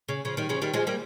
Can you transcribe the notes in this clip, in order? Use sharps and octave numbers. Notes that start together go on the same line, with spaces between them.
C#3
C#3 F3
D#3 G3
C#3 F3
D#3 G3
F3 G#3
G3 A#3